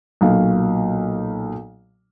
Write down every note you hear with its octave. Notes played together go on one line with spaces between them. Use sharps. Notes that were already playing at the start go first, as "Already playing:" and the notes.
B1 A#2 F#3 F5